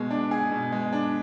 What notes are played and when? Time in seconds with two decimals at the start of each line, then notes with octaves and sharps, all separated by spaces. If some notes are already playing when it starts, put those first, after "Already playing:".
Already playing: B2 G#3
0.11 D4
0.31 G#4
0.52 B2
0.72 G#3
0.93 D4